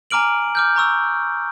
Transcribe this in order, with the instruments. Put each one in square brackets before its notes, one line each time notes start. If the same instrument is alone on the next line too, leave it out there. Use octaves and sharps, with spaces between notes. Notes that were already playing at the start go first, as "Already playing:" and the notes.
[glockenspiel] G#5 A#5 D6 F6 D7 F#7
D6 F6 G6
A#5 C#6 E6